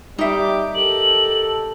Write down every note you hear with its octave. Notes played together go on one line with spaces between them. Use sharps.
G3 D#4 G4 E5 D6
G4 A4 A#4 F#7